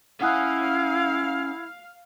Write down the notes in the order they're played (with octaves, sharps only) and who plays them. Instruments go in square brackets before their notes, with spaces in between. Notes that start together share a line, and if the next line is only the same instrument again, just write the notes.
[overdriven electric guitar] C#4 G#5 [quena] E4 [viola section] F5 [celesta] F#5 D#6 F#6